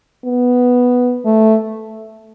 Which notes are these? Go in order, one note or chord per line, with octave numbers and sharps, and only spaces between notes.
B3
A3